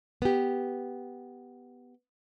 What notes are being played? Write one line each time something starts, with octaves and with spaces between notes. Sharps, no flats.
B3 G4